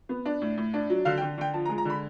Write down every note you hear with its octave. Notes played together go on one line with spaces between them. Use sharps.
B3
D4
A2
A2
D4
F#3
D3 F5
G5
D3
D3 G5
F3 A5
A#5
G#3
A#5
D3 B5